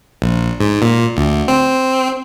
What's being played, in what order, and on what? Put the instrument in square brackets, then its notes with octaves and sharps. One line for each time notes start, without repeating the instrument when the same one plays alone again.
[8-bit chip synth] A#1
G#2
A#2
D2
C4